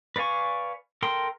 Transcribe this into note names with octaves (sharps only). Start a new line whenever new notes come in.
B4 D5 F5 G#5 C#6
A4 A#4 G5 C6